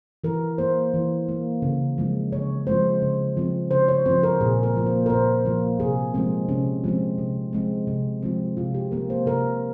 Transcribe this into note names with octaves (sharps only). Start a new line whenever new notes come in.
E3 A#4
A#3 C5
E3
A#3
C#3
F3 G#3 C4
C#3 C#5
F3 G#3 C4 C5
C#3
F3 C4
C#3 C5
C#5
F3 C4 C5
A#4
A#2 G#4
A#4
F3 A#3
C5
A#4
A#2 C5
F3 A#3
C3 G#4
F3 G#3 C4
C3 C#4
F3 G#3 C4
C3
F3 G#3 C4
C3
F3 G#3 C4
C3 F4
G4
F3 A#3 A#4
C5
C3 A#4